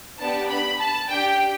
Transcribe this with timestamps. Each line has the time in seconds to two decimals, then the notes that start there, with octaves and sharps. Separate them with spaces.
0.18 B3 D4 G4 A5
0.49 B5
0.79 A5
1.09 D4 G4 G5